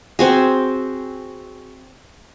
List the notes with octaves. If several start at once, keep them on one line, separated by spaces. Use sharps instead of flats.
C4 F#4 G#4